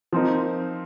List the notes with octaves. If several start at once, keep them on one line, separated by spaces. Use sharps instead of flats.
F3 C4 D#4 A#4